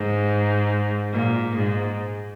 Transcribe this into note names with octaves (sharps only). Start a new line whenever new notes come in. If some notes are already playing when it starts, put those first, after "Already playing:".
Already playing: G#2
A#2
G#2